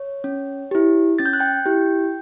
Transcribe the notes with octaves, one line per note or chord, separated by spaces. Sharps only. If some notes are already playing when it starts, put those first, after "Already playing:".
Already playing: C#5
C#4
E4 G4
C#4 A6
G6
F#6
G5 G6
E4 G4